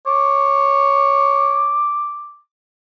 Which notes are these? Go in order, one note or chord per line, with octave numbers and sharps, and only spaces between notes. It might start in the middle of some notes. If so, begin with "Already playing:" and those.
C#5 D6